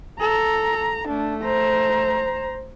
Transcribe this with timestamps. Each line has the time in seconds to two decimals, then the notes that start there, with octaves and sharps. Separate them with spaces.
0.20 A4 A#5
1.08 A3 D4
1.44 C5 A#5